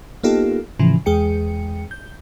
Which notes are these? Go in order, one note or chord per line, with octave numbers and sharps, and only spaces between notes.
A#3 B3 D#4 F4 G4 A4
A2 C#3 E3 F3
E2 G#3 G#4 G5 C#7
G6